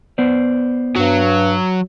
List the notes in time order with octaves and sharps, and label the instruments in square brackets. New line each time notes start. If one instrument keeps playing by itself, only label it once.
[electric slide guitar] B3 C5 D5
[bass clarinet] G2 [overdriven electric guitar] F#3